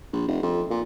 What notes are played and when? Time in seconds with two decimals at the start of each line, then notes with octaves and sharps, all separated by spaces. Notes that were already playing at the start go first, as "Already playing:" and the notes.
0.13 A#1
0.28 F1
0.43 F2
0.70 A#2